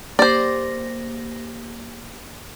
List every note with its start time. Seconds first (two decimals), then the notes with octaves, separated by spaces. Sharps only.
0.19 A#3 G4 C5 D5 A#6